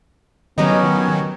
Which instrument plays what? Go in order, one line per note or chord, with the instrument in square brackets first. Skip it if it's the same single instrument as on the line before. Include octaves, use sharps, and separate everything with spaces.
[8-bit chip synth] D#3 F#3 [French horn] B3 [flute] C#4 [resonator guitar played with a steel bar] G4 A#4 D#5